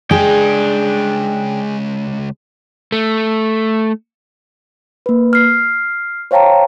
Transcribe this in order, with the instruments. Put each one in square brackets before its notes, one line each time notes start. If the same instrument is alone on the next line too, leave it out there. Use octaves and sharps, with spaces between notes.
[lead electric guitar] C#2 G#3 [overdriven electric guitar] D4 G5 [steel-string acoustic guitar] G#4
[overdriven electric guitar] A3
[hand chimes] A#3 B4
F6 C7
C5 C#5 F5 G5 A5 A#5